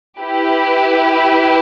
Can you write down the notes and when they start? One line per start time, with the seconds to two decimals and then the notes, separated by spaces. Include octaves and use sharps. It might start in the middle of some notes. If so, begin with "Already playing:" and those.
0.20 E4 G4 B4